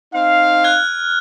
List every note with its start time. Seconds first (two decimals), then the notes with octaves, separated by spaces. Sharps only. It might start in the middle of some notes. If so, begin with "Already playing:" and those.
0.13 C4 D#4 F5
0.64 F6 F#6 G#6